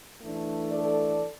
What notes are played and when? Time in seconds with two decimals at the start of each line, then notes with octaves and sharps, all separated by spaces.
0.21 E3 A3 D4
0.71 A4 D5